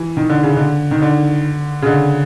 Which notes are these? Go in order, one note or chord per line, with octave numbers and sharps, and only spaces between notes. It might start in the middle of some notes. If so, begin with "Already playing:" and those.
Already playing: E3
D#3
D3
C#3
D3
D#3
D3
C#3
D3